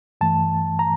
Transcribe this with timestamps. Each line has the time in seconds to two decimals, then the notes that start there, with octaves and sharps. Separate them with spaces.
0.21 G2 E3 A3 A5
0.79 A#5